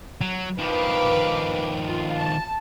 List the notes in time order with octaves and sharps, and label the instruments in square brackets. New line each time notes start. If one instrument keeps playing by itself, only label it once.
[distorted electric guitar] F#3
[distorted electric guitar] D#3 F3 [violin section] B4 F5 D6
[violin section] F4
A5